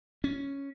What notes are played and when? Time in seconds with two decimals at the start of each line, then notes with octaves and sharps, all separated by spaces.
0.24 C#4